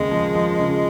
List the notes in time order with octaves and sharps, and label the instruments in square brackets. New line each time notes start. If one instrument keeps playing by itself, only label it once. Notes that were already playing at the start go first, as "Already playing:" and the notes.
Already playing: [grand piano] D#2 C#3 A#3 [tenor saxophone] G#3
[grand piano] F3
F3
C#3